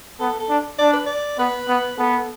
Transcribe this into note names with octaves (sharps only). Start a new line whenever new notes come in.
B3 A4
A4
D4
D4 D5
B4
D5
B3 B4
B3
B3 A4